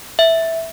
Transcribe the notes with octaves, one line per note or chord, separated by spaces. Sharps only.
E5